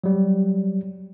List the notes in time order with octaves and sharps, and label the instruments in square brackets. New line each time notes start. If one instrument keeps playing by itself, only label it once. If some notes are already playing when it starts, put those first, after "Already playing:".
[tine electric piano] F#3 G3